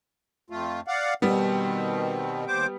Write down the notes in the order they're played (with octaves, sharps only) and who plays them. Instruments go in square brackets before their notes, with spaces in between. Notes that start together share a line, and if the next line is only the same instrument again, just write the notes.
[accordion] F2 A3 F4
D5 F5 F#5
[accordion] B2 D#3 C4 [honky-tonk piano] G3 B3
[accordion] D#2 C5 D6